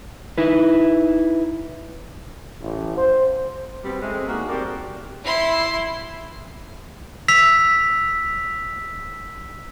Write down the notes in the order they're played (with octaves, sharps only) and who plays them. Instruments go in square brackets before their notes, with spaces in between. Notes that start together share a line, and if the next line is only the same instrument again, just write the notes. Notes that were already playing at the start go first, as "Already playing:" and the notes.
[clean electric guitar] D#4 E4 B4
[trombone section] A1
C5
[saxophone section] B2 G3 B3 C4
G#3 A3 C4
G#2 A#3 D4 F#4 G#4
G3 C4 F#4 G4 A#4 D5
[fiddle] E4 C6
[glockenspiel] E6 B6 F7